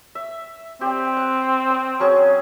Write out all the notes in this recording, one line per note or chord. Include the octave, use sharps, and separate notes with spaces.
E5
C4 G4 D5
F#5
D#6
F#3 C#4 G#4